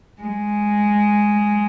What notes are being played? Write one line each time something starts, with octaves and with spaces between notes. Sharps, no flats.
G#3